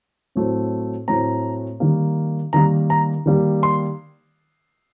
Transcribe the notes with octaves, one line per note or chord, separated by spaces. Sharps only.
A2 F#3 A3 C4
A2 F#3 A3 C4 A#5
D#3 G3 A#3
D#3 G3 A#3 A#5
A#5
D#3 G3 A#3
C6